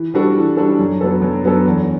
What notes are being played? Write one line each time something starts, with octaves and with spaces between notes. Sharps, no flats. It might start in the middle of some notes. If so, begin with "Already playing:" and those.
Already playing: E3
G3 D4 F#4 A4
E3
G3 D4 F#4 A4
F#2
F#3 B3 D4 A4
F#2
F#3 B3 D4 A4
E2